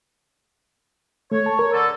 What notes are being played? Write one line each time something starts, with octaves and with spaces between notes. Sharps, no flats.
A3 C#5
A5
A#4
D3 A4